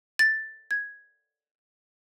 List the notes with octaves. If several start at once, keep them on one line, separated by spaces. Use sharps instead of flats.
A6
G#6